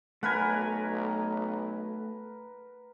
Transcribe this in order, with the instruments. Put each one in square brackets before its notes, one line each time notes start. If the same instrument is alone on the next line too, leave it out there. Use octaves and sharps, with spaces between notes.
[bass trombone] B1 [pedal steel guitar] A3 G#5 [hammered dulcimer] A#4 B4 F#5